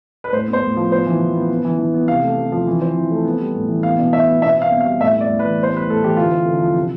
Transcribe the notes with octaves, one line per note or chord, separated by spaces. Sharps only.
B4
A2 C5
B3
C5
A2
F3
B3 C5
E3
E3
B3
B3
E3
E3
B3
C3 F5
A3
C3
F3
E3
C4
E3
A3
B3
G3
A2
E3
B3 F5
B2
B2 E5
B3
B2 E5
C4 F5
B2
F5
G3
A2 E5
B3
D5
A2
B4
E3
B3 C5
G3 B4
A2 A4
E3 G4
D3 F4
C4
D3
F3
C3